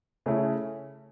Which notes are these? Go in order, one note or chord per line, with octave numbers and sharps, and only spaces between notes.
C#3 A3 C#4 E4